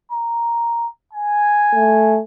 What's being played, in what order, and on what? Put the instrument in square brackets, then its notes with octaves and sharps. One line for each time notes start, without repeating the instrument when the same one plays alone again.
[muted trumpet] A#5
G#5
[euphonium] A3